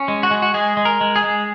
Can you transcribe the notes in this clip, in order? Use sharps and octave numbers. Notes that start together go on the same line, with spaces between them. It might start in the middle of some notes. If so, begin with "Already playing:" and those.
Already playing: C#4
G#3
F#4
G#3
F#4
G#3 G#4
G#3
A#4
G#3
G#4
G#3